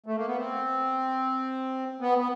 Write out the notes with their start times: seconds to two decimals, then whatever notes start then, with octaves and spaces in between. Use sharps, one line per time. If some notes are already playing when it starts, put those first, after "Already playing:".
0.06 A3
0.16 A#3
0.27 B3
0.37 C4
2.01 B3
2.18 B3